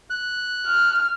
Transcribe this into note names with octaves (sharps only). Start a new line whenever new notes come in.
F#6
F6